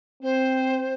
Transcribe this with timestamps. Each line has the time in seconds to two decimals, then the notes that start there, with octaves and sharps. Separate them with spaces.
0.23 C4 C5